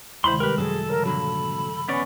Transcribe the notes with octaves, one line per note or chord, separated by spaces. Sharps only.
D2 C3 D#3 G#3 E4 C5 B5 C6
G3 G4 A#4 B4
F#2 F#3 G#4 A4
G2 C#3 F3 A#4
A#2 D3 F#3 B5
B3 C#4 C#5 D5 G#5